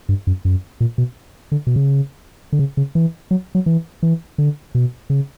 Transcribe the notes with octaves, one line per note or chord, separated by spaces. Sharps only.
G2
F#2
F#2
A#2
B2
D3
B2
C#3
D3
C#3
C#3
E3
F#3
F#3
E3
E3
D3
B2
C#3